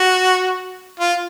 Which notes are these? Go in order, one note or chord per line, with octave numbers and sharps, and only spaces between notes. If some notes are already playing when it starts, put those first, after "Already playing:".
Already playing: F#4
F4